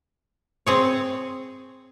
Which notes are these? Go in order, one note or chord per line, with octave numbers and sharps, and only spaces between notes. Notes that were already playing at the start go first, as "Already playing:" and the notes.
C4 G#4 C#5